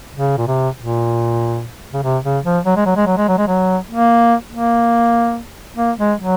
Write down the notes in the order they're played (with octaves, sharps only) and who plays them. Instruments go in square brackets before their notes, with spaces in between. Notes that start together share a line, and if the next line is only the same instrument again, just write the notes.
[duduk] C#3
A#2
C3
A#2
C#3
C3
C#3
F3
F#3
G#3
F#3
G#3
F#3
G#3
F#3
G#3
F#3
A#3
A#3
A#3
G#3
F#3